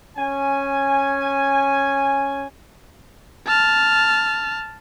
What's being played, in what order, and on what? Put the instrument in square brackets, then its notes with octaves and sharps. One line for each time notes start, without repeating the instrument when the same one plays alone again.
[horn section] C#4 G#5
[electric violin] A5 F6